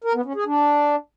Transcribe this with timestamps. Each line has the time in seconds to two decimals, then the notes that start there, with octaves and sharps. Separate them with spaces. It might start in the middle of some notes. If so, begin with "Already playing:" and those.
0.04 A#4
0.15 B3
0.25 C#4
0.36 G#4
0.46 D4